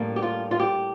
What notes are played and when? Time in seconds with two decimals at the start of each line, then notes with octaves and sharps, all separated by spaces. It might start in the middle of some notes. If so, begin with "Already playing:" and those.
Already playing: A2 G3 A#3 D4
0.16 G4
0.22 F4
0.51 F4
0.60 G4